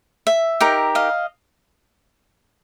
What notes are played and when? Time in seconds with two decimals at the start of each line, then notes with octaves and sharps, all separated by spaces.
0.27 E5
0.60 D#4 G4 A#4
0.95 D#5 F5